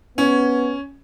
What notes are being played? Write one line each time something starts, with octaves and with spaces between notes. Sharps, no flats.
B3 C#4